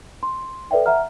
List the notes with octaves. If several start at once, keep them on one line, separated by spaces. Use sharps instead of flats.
C6
A4 B4 D5 E5 G5
E5 F#5 A#5 F6